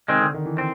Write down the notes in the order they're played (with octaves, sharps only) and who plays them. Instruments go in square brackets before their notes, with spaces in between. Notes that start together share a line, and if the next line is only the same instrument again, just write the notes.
[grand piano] C3 [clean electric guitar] D#3 G#3 C4
[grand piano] D3
D#3
E3
[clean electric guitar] C4